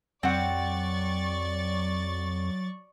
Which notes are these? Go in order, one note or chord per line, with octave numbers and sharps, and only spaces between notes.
F2 F#3 C4 D5 F#5 C#6 A6